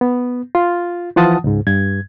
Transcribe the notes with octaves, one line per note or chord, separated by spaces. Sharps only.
B3
F4
E3 F3 F4 F#5 A5 D#6
C#2 G#2
G2 G#6